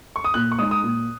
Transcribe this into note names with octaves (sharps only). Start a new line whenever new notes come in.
C#6
D#6
A#2 F#6
C#6
G#3 D#4 D#6
D#6
A#2